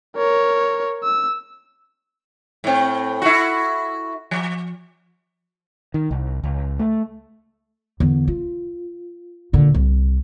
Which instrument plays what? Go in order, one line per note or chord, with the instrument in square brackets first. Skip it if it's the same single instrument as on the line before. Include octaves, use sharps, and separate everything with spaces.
[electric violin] A#4 C#5
E6
[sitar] A2 C4
E4 F#4
F3
[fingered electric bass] D#3
C2
C#2
A3
[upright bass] E2 D3
F4
A#2 D3
C2